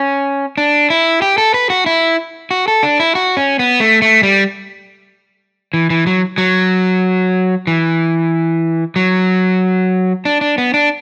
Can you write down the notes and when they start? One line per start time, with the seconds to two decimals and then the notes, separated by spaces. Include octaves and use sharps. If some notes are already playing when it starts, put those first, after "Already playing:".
Already playing: C#4
0.58 D4
0.90 E4
1.22 G4
1.38 A4
1.54 B4
1.70 F#4
1.86 E4
2.51 F#4
2.68 A4
2.83 D4
3.00 E4
3.15 F#4
3.37 C#4
3.59 B3
3.80 A3
4.02 A3
4.23 G3
5.74 E3
5.90 E3
6.07 F#3
6.38 F#3
7.67 E3
8.96 F#3
10.25 D4
10.41 D4
10.58 B3
10.74 D4